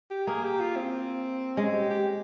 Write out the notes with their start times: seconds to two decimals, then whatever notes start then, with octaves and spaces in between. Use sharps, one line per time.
0.10 G4
0.27 A#3 G#4
0.44 G4
0.60 F4
0.76 C4
1.57 G#3 C#4
1.74 G4
1.90 G4